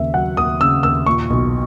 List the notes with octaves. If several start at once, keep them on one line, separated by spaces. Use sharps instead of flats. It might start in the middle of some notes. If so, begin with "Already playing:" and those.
Already playing: D#2 C#3 E5
F#3 F#5
D#2 D#6
C#3 E6
D#2 E6
A#2 C#6
B1